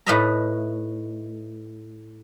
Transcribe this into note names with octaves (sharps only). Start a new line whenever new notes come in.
A2 D#4 B4 D#5 E5 A#5